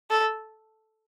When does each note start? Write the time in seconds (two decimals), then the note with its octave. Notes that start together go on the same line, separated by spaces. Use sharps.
0.11 A4